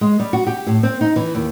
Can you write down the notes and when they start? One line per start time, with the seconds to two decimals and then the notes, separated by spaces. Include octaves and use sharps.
0.01 G#3
0.19 G3
0.33 F#4
0.47 G4
0.66 A2
0.83 C4
1.01 D#4
1.16 E3
1.35 D#2